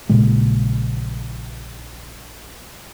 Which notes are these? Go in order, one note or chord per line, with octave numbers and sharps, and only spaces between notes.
A#1 A#2 C#3 G#3